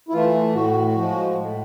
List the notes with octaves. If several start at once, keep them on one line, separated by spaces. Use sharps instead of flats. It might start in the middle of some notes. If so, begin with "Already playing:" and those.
E4
E3 A3 F4
A2 F#4
F3 G#3
A2